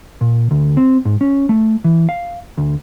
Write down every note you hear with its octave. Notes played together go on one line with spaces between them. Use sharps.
A#2
D2
C4
G#2
C#4
A3
E3
F5
D2